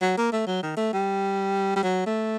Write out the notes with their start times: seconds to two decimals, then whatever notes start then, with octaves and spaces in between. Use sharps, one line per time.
0.01 F#3
0.17 A#3
0.32 A3
0.47 F#3
0.63 D#3
0.77 A3
0.93 G3
1.76 G3
1.83 F#3
2.06 A3